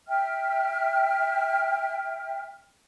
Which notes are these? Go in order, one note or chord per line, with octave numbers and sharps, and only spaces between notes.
E5 G5 F6